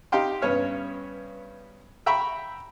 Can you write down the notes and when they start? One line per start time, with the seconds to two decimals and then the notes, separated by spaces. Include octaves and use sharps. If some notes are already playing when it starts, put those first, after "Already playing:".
0.12 D#4 G4 F5 G5 C6
0.42 G2 B3 C#4 C#5 F6
2.06 E5 G5 A#5 B5 C#6